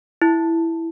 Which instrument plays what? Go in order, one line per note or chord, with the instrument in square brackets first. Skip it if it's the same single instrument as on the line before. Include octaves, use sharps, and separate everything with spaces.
[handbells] E4